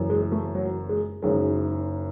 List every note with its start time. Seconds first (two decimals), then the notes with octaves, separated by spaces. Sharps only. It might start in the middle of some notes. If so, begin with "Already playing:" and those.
Already playing: F#1 F#2 E3
0.10 G#3
0.32 A3
0.55 F#3
0.89 G#3
1.23 F#1 F#2 D#3 G#3